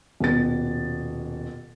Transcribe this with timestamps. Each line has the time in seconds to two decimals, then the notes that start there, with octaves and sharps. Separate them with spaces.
0.20 D#1 B2 A6